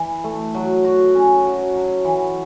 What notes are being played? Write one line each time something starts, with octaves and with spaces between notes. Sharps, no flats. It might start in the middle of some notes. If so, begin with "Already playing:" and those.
Already playing: E3
A3
F#3
F#4
C#4
F#3
F#3
E3